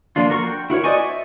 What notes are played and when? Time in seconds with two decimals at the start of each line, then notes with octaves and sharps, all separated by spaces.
0.16 F3 A#3 D4 F4
0.30 F#4 A#4 C#6
0.44 G5
0.70 E4 F#4 A#4 C#5
0.84 C5 D5 D#5 G#5 C#6
0.98 E5